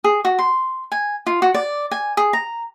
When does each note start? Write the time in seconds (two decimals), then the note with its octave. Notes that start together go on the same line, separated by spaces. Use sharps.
0.04 G#4
0.25 F#4
0.39 C6
0.92 G#5
1.27 F4
1.42 F#4
1.54 D5
1.91 G#5
2.17 G#4
2.33 A#5